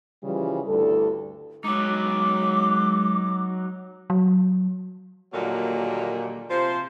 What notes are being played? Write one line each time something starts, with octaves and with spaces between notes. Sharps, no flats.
C#3 E3 F3 G3
D2 G2 E4 A4
F#3 G#3 D#4 D6
F#3
A#2 D3 D#3 F#3 G3 A#3
C3 F3 F4 C5